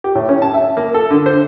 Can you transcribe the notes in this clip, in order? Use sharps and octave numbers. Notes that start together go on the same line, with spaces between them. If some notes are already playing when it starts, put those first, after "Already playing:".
G4
A2
C#4
A5
E5
A#3
A4
D3
C5